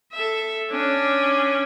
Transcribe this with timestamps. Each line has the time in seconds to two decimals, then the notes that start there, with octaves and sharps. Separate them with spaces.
0.13 A4 E5
0.71 C#4 D4